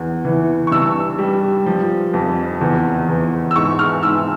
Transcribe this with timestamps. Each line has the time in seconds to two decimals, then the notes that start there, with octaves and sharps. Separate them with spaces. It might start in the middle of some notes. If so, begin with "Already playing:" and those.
Already playing: E2
0.25 E3
0.67 C#6
0.71 G2 E6
1.19 G3
1.66 F3
2.14 F2
2.61 E2
3.09 E2
3.51 E6
3.56 G#2 C#6
3.79 F6
4.03 G#2 E6